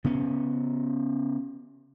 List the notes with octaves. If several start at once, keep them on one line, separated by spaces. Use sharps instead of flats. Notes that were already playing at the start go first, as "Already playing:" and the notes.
C#3 B3 C#4